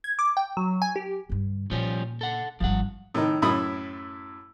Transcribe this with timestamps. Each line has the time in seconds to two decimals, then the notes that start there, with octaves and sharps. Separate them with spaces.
0.04 G#6
0.19 D6
0.37 G5
0.57 F#3
0.82 G#5
0.96 G4
1.30 G2 D3
1.71 A#2 F3 G3 C#4
2.21 A4 F#5
2.60 G#1 F3 G3 F#5
3.14 A2 D#3
3.42 F#2 A2 E4 B5 D#6